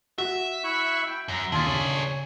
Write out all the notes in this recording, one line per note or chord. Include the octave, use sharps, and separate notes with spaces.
F#4 E5
E4 C#6 F#6
G5
F#2 E5 A#5
D#2 D4 F4 G#4 E5 G#5 A6
C#3 C#5